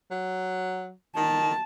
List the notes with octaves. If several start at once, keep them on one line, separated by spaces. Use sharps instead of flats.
F#3
D#3 A5